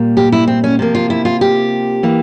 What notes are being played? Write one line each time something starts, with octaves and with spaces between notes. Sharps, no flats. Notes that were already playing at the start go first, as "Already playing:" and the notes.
Already playing: A#2 G3 A#3
G4
E4
C4
C#4
C3 F3 A#3
F4
E4
F4
G4
E3 A#3